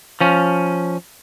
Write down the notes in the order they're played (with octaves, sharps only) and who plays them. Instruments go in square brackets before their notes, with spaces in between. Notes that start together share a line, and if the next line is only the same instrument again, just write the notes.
[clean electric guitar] F3 C#4